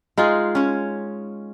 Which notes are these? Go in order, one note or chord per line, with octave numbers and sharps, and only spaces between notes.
G#3 D#4 F4 G#4
C#4 C#5